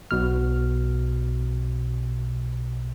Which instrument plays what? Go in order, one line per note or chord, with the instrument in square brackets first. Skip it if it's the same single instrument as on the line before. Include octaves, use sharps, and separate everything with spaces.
[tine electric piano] B1 B2 F6